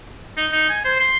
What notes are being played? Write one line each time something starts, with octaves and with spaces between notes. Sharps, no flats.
D#4
D#4
G#5
C5
C6